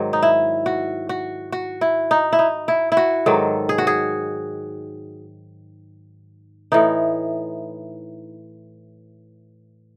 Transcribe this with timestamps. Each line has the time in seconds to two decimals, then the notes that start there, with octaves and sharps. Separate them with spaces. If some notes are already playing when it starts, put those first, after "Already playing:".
Already playing: G#2 D#3 F#3
0.13 D#4
0.23 E4
0.66 F#4
1.09 F#4
1.52 F#4
1.81 E4
2.11 D#4
2.33 E4
2.39 D#4
2.68 E4
2.92 E4
2.97 F#4
3.26 G#2 D#3 F#3 A4
3.69 G#4
3.78 F#4
3.87 G#4
6.72 A2 E3 D#4